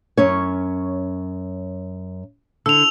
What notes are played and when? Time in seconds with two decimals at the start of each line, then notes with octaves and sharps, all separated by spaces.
0.17 F#2 C#4 C#5
2.66 D3 E6 F7